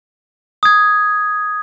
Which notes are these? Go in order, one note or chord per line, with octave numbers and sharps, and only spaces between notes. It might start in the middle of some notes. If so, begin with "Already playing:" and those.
D#6 G#6